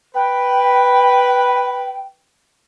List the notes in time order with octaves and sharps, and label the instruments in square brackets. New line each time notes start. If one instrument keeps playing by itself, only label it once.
[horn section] B4 [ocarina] G5